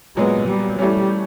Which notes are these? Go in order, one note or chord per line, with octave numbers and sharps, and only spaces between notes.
A#2 F#3 G#3 B3
G3
E3 G3 A3 C#4